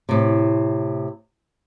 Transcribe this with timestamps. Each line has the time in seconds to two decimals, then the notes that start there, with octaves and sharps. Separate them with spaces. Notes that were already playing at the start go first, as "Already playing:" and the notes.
0.09 A2 C3